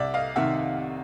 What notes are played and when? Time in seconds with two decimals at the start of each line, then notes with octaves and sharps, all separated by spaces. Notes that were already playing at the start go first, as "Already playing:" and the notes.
Already playing: C2 D5 E5
0.14 D#5 F5
0.36 C3 D#3 E5 F#5